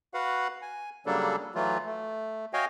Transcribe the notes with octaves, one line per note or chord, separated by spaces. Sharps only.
F#4 B4 F5 F#5
G#5
C#3 F#3 G3 A#3 D4 A4
E3 F#3 A3 F4
A3
F#4 C#5 D#5 F5 G5 G#5